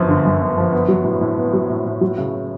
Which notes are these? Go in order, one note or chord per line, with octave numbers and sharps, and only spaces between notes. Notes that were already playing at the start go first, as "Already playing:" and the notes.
Already playing: G1 F#2 F3
D3
F#2
G1
F3
B3
F#3
A2
A2
B3
F#3
A2
A2
F#3
C#3